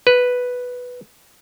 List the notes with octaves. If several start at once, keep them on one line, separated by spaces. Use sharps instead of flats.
B4